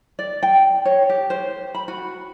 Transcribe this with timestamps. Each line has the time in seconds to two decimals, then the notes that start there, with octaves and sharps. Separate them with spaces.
0.19 D5
0.43 G5
0.85 C#5
1.10 G4
1.30 C5
1.75 B5
1.88 F#4